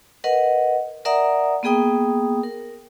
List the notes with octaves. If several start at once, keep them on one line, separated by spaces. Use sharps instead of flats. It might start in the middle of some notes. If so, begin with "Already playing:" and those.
A#4 B4 D#5 F#5
A#4 D5 E5 F#5 A#5 D#6
A#3 B3 G#4 G5 D#6
A#4